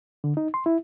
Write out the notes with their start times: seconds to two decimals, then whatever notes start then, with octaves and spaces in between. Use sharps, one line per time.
0.24 D3
0.37 D#4
0.54 C6
0.66 E4